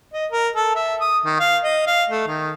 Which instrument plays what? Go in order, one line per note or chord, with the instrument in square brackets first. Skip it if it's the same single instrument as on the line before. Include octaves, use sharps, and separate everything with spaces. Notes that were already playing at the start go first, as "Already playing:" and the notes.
[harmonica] D#5
A#4
A4
E5
D#6
D#3
F5
D#5
F5
A3
D#3